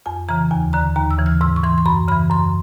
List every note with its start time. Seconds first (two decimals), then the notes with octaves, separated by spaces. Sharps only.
0.06 F2 G#5
0.29 C#3 E3 A#5
0.51 D#2 G#5
0.73 D3 A#5
0.96 D#2 A#5
1.11 E6
1.18 C#3 E3
1.26 F6
1.41 G#2 E6
1.56 C#6
1.63 E3 C6
1.78 C6
1.86 F#2 B5
2.08 C#3 B5
2.12 E3
2.30 F#2 C6